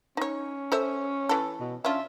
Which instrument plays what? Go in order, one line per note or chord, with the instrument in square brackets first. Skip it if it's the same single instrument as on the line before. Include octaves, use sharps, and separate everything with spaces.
[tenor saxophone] C#4 [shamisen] D#4 C#5
[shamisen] A4 C5 E5
E3 A4
[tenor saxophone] B2
[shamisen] C#4 D4 F4 [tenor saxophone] E5